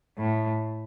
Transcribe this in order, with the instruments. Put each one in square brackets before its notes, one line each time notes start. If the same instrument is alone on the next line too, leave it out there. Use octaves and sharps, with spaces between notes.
[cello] A2